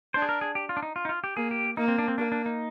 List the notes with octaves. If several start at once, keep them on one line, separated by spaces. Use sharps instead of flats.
D4 C5
G#4
A#4
G#4
G4
F4
D4
D#4
F4
D#4
F4
G4
A#3 G#4
G4
A#3 D#4
C4
D4
C4
A#3 D4
D4
D#4